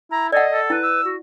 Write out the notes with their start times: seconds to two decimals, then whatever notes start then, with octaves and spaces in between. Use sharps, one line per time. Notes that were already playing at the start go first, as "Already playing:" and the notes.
0.11 E4 A#5
0.32 A4 D5 D#5 F#5
0.52 A4
0.70 E4 B4
0.83 E6
1.05 F#4